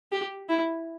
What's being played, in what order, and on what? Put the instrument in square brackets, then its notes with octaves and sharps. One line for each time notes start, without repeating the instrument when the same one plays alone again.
[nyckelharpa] G4
E4